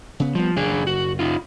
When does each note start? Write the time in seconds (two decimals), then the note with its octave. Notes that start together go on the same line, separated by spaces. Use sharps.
0.20 C#3 B3
0.35 F3 G3 B3
0.56 F#1 D4 G#4
0.87 F#4
1.19 D#4 F4